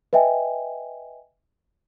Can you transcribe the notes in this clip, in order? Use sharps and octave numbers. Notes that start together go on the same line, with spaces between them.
B4 D#5 E5 G5 G#5